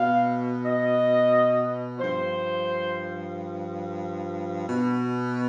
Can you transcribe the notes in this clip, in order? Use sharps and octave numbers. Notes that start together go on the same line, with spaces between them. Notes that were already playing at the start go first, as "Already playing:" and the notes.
Already playing: B2 F5
D#5
G2 F3 C5
B2